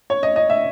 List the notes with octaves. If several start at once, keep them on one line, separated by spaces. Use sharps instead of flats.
C#5
D#5
D#5
E5